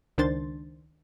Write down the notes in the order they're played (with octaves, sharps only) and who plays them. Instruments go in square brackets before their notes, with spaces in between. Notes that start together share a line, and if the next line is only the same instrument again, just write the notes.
[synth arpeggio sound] C#2 D#3 D4 C5 C6 A6